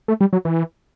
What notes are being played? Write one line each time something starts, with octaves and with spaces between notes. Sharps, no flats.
A3
G3
F#3
E3